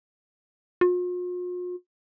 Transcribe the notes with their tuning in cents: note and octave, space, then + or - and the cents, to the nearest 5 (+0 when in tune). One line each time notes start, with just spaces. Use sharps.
F4 +45